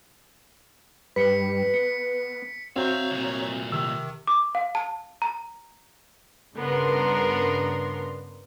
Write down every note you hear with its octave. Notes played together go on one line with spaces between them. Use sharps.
G2 G3 B4 B6 C#7
B3 C#7
C4 F#4 C#5 E5 F5 A#5 C#6 G6
C2 A#2
C3 D#3 E6
D6
F5
A5
A#5
G2 C#3 B3 D4 A#4 C6